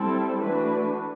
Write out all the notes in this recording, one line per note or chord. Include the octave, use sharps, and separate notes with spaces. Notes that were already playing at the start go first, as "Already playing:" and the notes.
Already playing: G3 C4 E4 A4
E3 A3 D4 F#4 B4